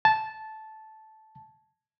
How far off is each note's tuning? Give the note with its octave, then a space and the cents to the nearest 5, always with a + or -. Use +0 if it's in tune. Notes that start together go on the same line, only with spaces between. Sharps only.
A5 -10